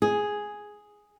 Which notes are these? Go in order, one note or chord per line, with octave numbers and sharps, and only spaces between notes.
G#4